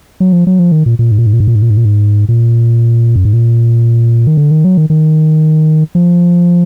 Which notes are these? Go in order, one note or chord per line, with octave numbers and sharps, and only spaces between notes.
F#3
F3
F#3
F3
D#3
A#2
A#2
G#2
A#2
G#2
A#2
G#2
A#2
G#2
A#2
G#2
A#2
G#2
A#2
F#2
G#2
A#2
D#3
D3
D#3
F#3
D#3
D#3
F3